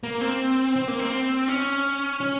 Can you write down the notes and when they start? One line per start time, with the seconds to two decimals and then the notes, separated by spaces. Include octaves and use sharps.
0.03 A#3
0.21 C4
0.76 C4
0.88 A#3
0.99 C4
1.48 C#4
2.20 C#4